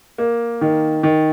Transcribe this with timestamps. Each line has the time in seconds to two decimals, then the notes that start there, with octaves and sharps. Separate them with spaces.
0.18 A#3
0.61 D#3
1.03 D#3